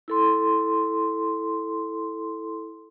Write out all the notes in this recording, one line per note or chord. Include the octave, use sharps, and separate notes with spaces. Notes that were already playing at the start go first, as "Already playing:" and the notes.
E4 A4 C6